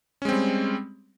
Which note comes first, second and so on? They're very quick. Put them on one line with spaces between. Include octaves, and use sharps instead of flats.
C#4 G#3 C4 G3